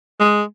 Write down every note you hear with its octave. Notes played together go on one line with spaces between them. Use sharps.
G#3